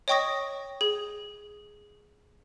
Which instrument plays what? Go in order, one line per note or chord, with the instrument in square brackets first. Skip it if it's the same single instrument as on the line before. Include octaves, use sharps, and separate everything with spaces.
[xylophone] C#5 D#5 G5 C#6 D#6 A#6
G#4